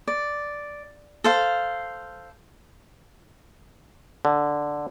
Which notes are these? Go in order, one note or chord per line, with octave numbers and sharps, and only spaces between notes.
D5
A4 C5 F5
D3